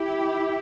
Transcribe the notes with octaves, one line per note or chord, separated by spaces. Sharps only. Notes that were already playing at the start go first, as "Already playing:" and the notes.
Already playing: E4 G4